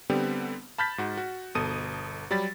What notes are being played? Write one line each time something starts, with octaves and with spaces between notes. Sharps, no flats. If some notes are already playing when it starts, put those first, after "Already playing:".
D3 G3 B3 C4 G4
A5 B5 F6 G6 A6 B6
G#2 F#4
F#4
G1 B2 A4 D#6 D#7
F#3 G3 G4 B5 A6